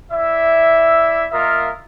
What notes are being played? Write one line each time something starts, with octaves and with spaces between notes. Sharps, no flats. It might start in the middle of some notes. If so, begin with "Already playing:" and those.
E4 D5 E5
A#3 F4 A#4 D#5 E5